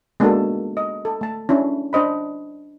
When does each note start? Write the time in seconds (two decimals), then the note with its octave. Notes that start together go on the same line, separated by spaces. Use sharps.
0.20 G#3 A#3 B3 D4 F#4 A4
0.77 D#5
1.05 A4
1.21 A3 A5
1.49 C#4 D4 E4
1.93 D4 C5 D#5 B5